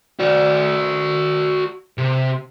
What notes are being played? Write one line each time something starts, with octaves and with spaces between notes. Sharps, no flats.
F#4 D5
C3